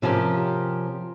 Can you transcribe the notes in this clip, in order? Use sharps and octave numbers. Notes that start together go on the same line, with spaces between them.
C3 F3 C#4 G4 A#4